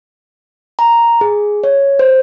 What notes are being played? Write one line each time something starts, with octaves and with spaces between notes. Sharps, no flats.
A#5
G#4
C#5
C5